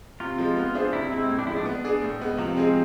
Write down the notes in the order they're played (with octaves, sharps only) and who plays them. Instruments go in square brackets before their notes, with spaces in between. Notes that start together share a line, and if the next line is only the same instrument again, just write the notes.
[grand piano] C3 [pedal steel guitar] F4
[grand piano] F3 G#3
B3
D4 G#4 C5 E5
[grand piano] C3 [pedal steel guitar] E4
[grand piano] G#3 C4 [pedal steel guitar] E4
[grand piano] A2
[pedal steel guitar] D4
[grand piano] F3 G#3 [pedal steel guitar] E4
[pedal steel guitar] D4
[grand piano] B3
D4 G#4 D5
A2
G#3 B3
[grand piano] C3 [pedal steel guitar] F3
[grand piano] G#3 C4 G#4